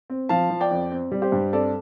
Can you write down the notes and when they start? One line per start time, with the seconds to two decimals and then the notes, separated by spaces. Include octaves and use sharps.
0.10 C4
0.29 F3 F5 A5
0.50 F3
0.61 D5 G5
0.71 F2
0.91 C4
1.12 G3
1.22 G4 C5
1.32 G2
1.52 C4 A4 D5